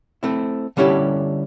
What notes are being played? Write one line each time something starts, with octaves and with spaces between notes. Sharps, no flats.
A3 C4 E4
D3 G3 C#4 E4 G4 A4